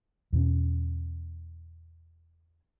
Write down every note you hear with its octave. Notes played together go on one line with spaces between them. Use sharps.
E2 B2 C#4